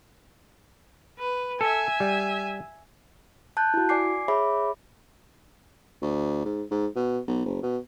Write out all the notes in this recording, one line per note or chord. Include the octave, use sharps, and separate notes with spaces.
B4
A4 E5 G#5
G3
A5 F#6 G6
E4 F#4
D5 G#5 D6 C7
G#4 C#5 E5 B5 D6
D2
G#2
G#2
B2
B1
F#1
B2